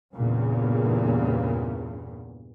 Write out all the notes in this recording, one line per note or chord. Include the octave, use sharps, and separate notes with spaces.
E2 G2 A#2 C#3